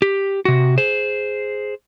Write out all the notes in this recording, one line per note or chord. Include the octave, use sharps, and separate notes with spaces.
G4
C3 F#4
G#4 C5